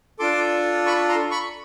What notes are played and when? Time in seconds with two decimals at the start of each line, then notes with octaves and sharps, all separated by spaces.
0.19 D4 F4 A4 C6 D6
0.86 B5 C#6
1.09 A#5 C6
1.31 B5 C#6